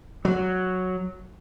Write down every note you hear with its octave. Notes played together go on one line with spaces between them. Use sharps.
F#3